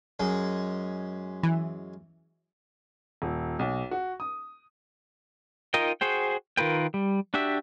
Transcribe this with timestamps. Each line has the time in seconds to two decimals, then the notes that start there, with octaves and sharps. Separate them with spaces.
0.20 F#2 G#3
1.43 E3
3.22 D#1
3.59 B1
3.91 F#4
4.20 D#6
5.74 D#4 F4 A#4 D#5 G5
6.01 F#4 G#4 C5 G5
6.57 D#3 F4 A#4 B4 G5
6.94 G3
7.34 D4 F#4 G4 E5